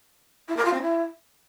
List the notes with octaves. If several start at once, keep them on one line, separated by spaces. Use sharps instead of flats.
E4
A#4
F4
C4
E4